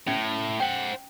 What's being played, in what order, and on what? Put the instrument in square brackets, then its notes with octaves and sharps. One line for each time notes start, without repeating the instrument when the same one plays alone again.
[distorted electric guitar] A2 [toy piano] C#4
[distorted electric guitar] C5 F#5 [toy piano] G5